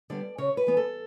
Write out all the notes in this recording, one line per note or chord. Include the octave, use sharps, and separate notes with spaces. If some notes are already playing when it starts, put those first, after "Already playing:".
D3 G3 B3 D5
C#3 C#5
B4
E3 B3
A4